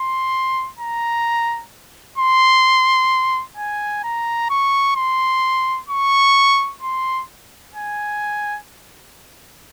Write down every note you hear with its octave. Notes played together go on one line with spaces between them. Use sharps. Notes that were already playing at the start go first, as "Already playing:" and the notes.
Already playing: C6
A#5
C6
G#5
A#5
C#6
C6
C#6
C6
G#5